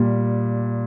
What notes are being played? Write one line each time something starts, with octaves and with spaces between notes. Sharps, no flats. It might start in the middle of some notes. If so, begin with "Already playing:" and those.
Already playing: A#2 G3